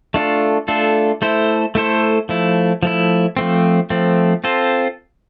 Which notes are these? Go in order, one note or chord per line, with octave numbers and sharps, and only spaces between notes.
A3 D4 F4 A4
A3 D4 F4 A4
A3 E4 A4 C5
A3 E4 A4 C5
F3 A3 E4
F3 A3 E4
F3 A3 C4
F3 A3 C4
C4 F4 A4 C5